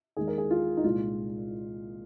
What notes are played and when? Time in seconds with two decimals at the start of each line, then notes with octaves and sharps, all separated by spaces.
0.17 D#2 D#3 G#3 G#4
0.28 A#4
0.38 G#4
0.51 F4
0.77 D#4
0.84 C2 A#2 G#3 F4